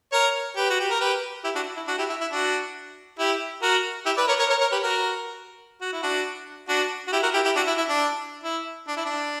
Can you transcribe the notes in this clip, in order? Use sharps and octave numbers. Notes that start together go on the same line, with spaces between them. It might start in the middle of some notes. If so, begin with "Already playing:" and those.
A#4 C#5
G4 B4
F#4
G4
A#4
G4 B4
E4 G4
D4 F#4
E4
D4 F#4
E4 G4
E4
E4
D4 F#4
E4 G4
F#4 A#4
E4 G4
B4 D5
A#4 C#5
A#4 C#5
A#4 C#5
A#4 C#5
G4 B4
F#4 A#4
F#4
E4
D4 F#4
D4 F#4
F#4
E4 G4
F#4 A#4
E4 G4
E4 G4
D4 F#4
E4
E4
D4
E4
D4
E4
D4